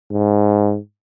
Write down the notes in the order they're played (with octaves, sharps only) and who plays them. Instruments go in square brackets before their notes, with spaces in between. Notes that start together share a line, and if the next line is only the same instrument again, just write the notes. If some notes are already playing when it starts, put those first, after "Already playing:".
[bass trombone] G#2